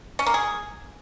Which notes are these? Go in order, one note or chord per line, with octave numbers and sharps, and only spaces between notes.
C#4
A#3
G#4